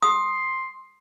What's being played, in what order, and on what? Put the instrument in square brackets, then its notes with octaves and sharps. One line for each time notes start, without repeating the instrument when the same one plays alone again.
[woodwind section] C6 [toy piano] D#6